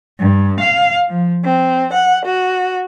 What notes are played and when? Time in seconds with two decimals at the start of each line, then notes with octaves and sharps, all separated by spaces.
0.20 G2
0.61 F5
1.09 F3
1.43 C4
1.92 F#5
2.25 F#4